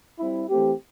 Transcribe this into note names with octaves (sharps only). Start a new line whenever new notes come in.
G3 C4 E4
E3 A3 C4 G4